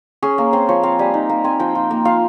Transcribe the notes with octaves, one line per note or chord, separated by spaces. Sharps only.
C#4 G#4
A#3
C4 C5
F3 C#5
C4 F5
G3 G#5
D#4
A#3
C4 G#5
F3 G5
F4
A#3
F4 F5